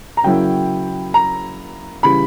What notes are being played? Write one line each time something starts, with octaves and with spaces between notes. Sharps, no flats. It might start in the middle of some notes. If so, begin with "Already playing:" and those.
A#5
C#3 F#3 A#3 E4 G5
A#5
C#3 E3 G3 B5